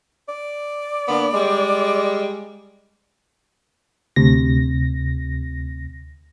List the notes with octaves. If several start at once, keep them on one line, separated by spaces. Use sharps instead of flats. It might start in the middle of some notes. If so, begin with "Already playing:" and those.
D5
D3 A#3 B3
G3 G#3
D2 C3 A#6